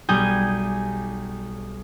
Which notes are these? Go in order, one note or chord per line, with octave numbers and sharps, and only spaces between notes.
B1 G3 G#4 G#5 D#6 G6